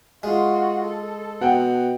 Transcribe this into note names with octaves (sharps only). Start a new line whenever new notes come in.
G#3 F4 F#4
A4
B2 F#5 G5